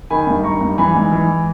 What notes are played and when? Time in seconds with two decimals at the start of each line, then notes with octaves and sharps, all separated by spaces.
0.10 D#3 G#5 B5
0.27 G2
0.43 D#3 A#5 C#6
0.61 G2
0.78 E3 G#5 B5
0.95 G#2
1.12 E3